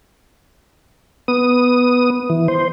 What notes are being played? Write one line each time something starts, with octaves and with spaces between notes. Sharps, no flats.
B3 D#6
E3
C5